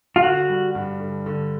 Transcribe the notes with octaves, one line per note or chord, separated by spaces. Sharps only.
F4
D3 F#4
G3
G2
D3
D3